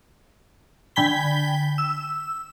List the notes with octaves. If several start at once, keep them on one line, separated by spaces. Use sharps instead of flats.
D3 G5 G#5 B5 B6 G7
E6